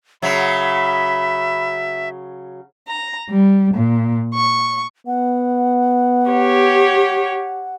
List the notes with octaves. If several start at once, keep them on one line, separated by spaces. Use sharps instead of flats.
C#3 F#3 E5 B5
A#5
G3
A#2
C#6
B3 F#5
G4 C#5